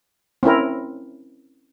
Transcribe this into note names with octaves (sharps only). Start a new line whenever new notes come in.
C4 C#4 E4 A#4